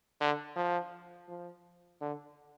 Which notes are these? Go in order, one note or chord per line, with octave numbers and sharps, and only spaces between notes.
D3
F3
F3
D3